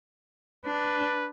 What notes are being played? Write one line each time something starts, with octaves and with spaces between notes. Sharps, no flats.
D4 B4